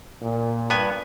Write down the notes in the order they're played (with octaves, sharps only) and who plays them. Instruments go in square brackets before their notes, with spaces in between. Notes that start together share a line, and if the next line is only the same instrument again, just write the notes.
[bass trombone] A#2
[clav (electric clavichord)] G2 B3 G#5